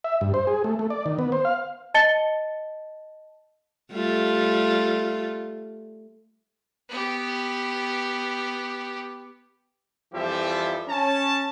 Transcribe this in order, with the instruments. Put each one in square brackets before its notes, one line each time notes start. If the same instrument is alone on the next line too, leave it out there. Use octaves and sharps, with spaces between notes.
[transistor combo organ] E5
G2
C5
G#4
A3
A3
D5
D#3
B3
C5
F5
[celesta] D#5 A5 A6 C#7 G7
[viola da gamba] G3 A3 F4
[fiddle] B3 G4
[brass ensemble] F2 E3 F3 G3 G4 E5
C#4 A5